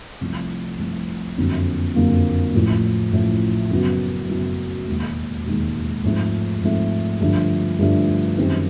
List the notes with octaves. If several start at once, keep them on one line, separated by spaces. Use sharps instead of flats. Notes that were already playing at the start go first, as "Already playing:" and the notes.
C2 C3 F3 A3
C2 C3 F3 A3
F#1 F2 D3 F#3 A#3
F#1 F2 D3 F#3 A#3
A1 A2 F3
A1 A2 F3
F#2 C#3 F#3 B3
F#2 C#3 F#3 B3
E1 D#2 D#3 G#3
E1 D#2 D#3 G#3
G#2 F3 A3 C4
G#2 F3 A3 C4
G2 D3 F3 A3 D4
G2 D3 F3 A3 D4
F#2 D#3 G3 C4 D#4